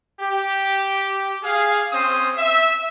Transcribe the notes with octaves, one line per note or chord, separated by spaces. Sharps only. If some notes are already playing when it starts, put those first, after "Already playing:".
G4
G#4 F5
C4 C#4 C5 D#6
E5